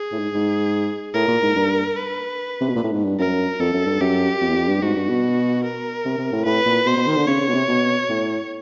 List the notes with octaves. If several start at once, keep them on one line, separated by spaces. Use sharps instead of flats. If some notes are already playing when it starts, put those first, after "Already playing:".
Already playing: G#4
A2
G#2
G#2
A2 A#4
A#2
G#2
G2
B4
C3
B2
A#2
A2
G#2
G2
F#2 A#4
F2 A4
F#2
G2
F#2 G4
F2
E2
F2
G2
G#2 F#4
G2
B2
A#4
C3
C3
A2
A2 B4
A#2
B2 C5
B2
D#3
D3
C#3 C#5
C#3
B2
C3
B2
A2